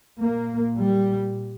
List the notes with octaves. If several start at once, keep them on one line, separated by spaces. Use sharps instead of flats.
A#2 A#3
G3